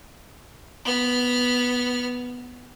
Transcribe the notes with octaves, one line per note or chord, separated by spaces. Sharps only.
B3 F6